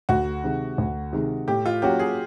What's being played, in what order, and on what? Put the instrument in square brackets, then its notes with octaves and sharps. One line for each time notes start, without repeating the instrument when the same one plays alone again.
[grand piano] D2 [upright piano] F#4
[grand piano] C3 D#3 G#3
D2
C3 D#3 G#3
[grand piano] A2 [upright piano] G4
[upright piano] F4
[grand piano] F#3 A#3 C#4 F#4 [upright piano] G4
[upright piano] G#4